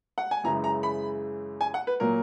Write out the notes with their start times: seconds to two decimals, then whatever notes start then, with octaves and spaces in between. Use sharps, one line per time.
0.18 F#5
0.31 G#5
0.44 F#2 C#3 E3 G#3 A#5
0.64 A#5
0.83 B5
1.61 G#5
1.74 F#5
1.87 B4
2.00 A#2 F#3 A#3 A#4